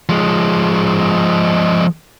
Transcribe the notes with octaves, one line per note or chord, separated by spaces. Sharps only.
F3 G#3